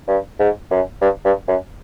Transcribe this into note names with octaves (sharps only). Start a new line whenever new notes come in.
G2
G#2
F#2
G2
G2
F#2